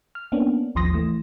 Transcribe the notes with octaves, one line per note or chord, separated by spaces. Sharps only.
F6
A#3 B3 C#4 D4
A1 D#2 F3 C6 D#6 A#6
E3 A3